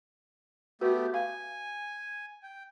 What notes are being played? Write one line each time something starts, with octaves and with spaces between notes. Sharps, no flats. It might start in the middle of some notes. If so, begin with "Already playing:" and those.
A3 B3 F#4 G4 B4
F5 G#5
G5